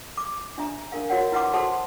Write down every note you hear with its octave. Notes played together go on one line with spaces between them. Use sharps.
D6
D4 E5 A#5
D4 A#4 F5
F#4 A#4 C#5 F#5
E4 B4 E5 F#5 C6 D6
F#4 A4 C5 F#5 A5 C6